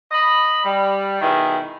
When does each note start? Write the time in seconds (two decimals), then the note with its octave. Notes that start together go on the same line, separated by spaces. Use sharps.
0.12 D#5 B5
0.64 G3
1.21 B2 D#3 E4 G#4